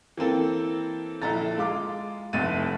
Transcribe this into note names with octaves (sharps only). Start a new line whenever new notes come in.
E3 A#3 C4 A4
A#1 E4 A4 A#5 A6
G#3 F4 D6
F1 C2 A3 E5 A6 D#7